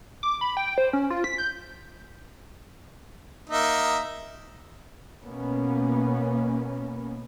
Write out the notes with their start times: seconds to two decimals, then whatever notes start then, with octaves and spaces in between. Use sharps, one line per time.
0.23 D6
0.41 B5
0.57 G5
0.78 C5
0.93 C#4
1.10 F4
1.24 B6
1.38 G6
3.50 A#3 D#4 E5
5.24 B2 A#3 B3 C#4